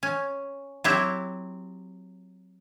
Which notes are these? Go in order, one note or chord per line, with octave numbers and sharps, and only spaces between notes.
C#4
F#3 C4 E4 G4